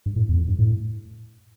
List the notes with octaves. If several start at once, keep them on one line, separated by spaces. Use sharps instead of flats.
G2
A2
E2
F2
G2
A2